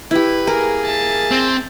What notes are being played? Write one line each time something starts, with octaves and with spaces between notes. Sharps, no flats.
E4 G4 B4
A#3 G#4 A#4
E5 A5
C4